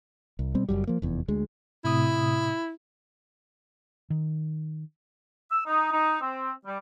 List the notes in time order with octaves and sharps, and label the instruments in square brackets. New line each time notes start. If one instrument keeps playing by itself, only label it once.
[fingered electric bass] C2
B2 G3 C4
F#1 B1 F#2 G3
F3 A#3
F1 E2
D2 G#3
[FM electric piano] A2 C3 D#6 [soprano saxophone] E4
[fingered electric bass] D#3
[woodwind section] E6
D#4
D#4
C4
G3